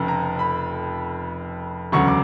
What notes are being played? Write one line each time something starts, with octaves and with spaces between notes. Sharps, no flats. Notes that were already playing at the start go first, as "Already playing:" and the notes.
Already playing: F1 F2 C#3
A#5
B5
E1 D2 C#3 F#3 C#6
D6